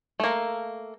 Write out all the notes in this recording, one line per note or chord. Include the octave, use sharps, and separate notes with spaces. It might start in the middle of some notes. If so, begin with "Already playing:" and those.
A3 A#3